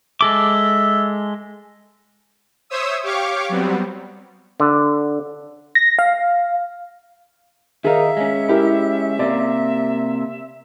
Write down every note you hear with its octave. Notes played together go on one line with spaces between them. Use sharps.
G#3 A4 E5 D6
C5 C#5 E5 D#6 E6
G4 C#5 F5 C#6 D6
F#3 G3 B3 C4
D3
A#6
F5
D#3 D#4 G#4 A#4 E5 F5
G#3 C#4
E4 G4 A#4
C3 A#3 D5